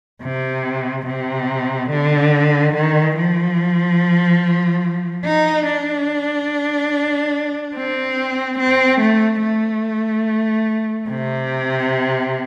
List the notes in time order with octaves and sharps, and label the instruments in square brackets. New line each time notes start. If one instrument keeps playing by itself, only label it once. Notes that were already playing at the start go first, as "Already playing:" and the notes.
[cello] C3
C3
D3
D#3
F3
D#4
D4
C4
C4
A3
A3
C3